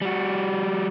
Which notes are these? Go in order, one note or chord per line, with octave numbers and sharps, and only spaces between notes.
G3 F#4